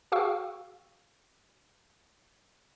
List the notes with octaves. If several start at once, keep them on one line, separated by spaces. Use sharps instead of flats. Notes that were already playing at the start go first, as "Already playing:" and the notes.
F#4 G#4 F5 G5 C#6 E6